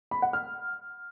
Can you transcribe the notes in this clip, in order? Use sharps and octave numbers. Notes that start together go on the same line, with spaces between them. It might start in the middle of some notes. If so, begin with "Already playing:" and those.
B5
F#5
F6